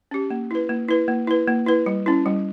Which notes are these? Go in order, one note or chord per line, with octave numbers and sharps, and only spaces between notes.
C#4 G4
A#3
E4 B4
A#3
E4 B4
A#3
E4 B4
A#3
E4 B4
G3
C#4 E4
G3